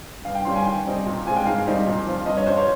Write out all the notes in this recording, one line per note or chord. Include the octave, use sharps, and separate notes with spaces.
G2 F5
G5
G3 C#4 F4 C6
G#5
D#3 G5
G3 C4 D#4
A#2
G#3 C4 F4 G#5
G5
G#2 F5
D#3 G3 C4 D#4
A#2
F3 C4 F4
G2 D#5
C#5
G3 C#4 F4 C5
C#5